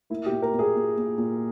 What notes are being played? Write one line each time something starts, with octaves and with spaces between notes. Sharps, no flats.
A#3 E4
G4
A#2
A#4
A#2
G#4
A#2
A#2
A#2